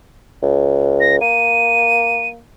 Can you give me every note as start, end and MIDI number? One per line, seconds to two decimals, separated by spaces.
0.43 1.20 37
1.01 1.16 94
1.21 2.43 58
1.21 2.27 99